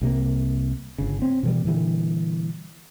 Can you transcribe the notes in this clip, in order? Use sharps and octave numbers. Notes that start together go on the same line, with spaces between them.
C2 C3 A#3
G1 C#3
C4 C#4
B2 E3 G3
A#2 D3 E3 G3